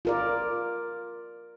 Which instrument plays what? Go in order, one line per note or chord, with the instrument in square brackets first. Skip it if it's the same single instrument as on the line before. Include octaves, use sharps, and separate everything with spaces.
[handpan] F4 A#4 D5